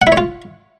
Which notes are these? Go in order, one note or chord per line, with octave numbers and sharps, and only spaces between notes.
F#5
E4
C#5
F4